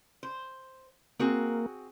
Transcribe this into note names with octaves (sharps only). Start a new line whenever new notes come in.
C5
A#3 C4 F#4 G#4